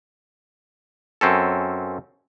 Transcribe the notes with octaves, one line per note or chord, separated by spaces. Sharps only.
F#2 C4 C#4 A4